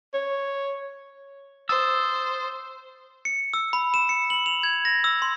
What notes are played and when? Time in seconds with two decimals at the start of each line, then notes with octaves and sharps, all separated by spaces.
0.14 C#5
1.69 C5 D#6 E6 A6
3.25 C#7
3.54 E6
3.73 B5
3.94 E7
4.09 C#7
4.30 F#7
4.46 F7
4.63 G#6
4.85 A#6
5.04 E6
5.22 C6